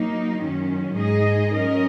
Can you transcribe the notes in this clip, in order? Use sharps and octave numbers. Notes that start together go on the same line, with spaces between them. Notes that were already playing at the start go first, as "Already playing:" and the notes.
Already playing: F#3 A#3 D#4
F#2 D#3 F#3 C#4
G#2 G#3 D#4 G#4 D#5
F#3 C#4 A#4 D#5